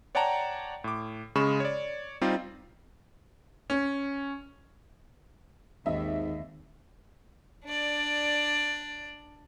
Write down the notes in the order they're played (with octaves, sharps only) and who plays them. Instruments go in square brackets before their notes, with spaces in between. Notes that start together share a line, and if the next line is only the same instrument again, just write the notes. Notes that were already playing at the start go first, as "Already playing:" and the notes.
[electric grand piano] C#5 D5 F#5 G5 A5 A#5
A2 D6
C#3 G#3 B5 C#6 E7
C#5 D5
G3 C4 D#4 F4 G4
[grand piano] C#4
[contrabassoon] G#1 [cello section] D#2 [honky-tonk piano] D#5 E5
[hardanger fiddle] D4 D5